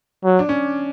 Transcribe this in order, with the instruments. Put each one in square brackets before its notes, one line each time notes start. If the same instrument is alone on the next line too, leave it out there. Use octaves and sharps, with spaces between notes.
[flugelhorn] F#3
[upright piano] D4
C#4